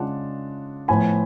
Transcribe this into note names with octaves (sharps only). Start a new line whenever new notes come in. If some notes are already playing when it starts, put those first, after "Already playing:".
Already playing: C#3 G#3 D4 F4 F#5 A5
A2 F3 B3 F4 G#5 B5